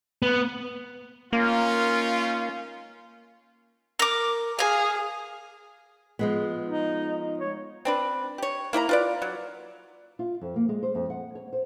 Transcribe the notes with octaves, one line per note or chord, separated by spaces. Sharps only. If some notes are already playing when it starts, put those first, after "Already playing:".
B3
A#3 C#4 D#4 F4
A#4 D6
G#4 F5 G#5
F3 G#3 B3
D#4
C#5
C4 D4 B4
G4 C#5
A#3 E4 B4 A#5
F4 B4 D5
F#3
F4
F2
A#3
G#3
C5
F2
F#5
C#5
C5